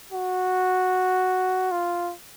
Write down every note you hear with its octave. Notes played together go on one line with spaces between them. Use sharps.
F#4
F4